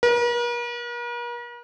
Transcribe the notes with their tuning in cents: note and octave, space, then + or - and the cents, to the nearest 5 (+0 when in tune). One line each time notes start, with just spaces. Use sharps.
A#4 +45